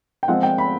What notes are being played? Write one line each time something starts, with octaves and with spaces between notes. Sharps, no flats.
G5
F3 G#3 C4 F4 F#5
G5
B5